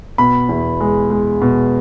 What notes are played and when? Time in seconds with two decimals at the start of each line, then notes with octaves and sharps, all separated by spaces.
0.18 B2 B5
0.49 E2
0.80 G#3
1.11 G#3
1.42 B2